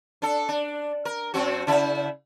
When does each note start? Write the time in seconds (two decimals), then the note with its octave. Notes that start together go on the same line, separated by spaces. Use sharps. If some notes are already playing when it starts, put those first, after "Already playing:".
0.22 D4 A4
0.49 D4
1.05 A#4
1.34 F#2 C4 F#4
1.67 C#3 E4